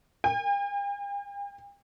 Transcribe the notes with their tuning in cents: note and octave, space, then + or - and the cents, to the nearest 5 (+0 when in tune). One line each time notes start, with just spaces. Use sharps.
G5 +45